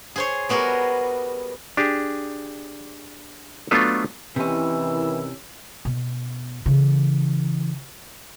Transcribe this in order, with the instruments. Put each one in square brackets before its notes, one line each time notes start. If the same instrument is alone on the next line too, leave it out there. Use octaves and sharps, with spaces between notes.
[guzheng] G#4 C5 C#5
G3 B3 F#4 G#4 A#4
[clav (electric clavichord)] D4 G4 G#4
F#3 A3 B3 D4 F4 A4
[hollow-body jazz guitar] C3 C#4 [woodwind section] D#3 E4 E6 [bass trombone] E3
[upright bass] B2
C#3 E3